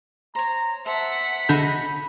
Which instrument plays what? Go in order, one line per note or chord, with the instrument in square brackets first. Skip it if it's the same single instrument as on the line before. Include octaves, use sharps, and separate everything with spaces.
[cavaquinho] C5 C#5 [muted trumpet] A#5
[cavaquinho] C5 A5 [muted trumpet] E5 [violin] F#5 B6
[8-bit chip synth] D3 D4 G6 [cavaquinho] D#4 F#4 G#4 [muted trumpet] B5